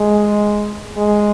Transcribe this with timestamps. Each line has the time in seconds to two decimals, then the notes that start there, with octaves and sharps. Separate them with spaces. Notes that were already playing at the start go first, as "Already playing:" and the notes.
Already playing: G#3
0.97 G#3